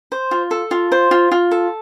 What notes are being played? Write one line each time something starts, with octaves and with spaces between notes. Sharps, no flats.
C5
F4
A4
F4
C5
F4
F4
A4